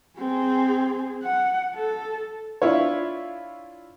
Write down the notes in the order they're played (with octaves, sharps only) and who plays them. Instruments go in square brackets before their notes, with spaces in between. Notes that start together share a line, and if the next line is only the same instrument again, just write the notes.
[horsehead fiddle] C4 G#4
F#5
A4
[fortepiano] D4 E4 F4 C#5